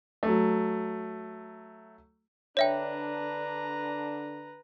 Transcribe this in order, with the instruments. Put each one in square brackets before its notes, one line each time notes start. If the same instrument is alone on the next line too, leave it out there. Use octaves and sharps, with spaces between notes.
[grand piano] F#3 A3
[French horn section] D3 D4 [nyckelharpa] B4 A#5 [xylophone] C#5 E5 G5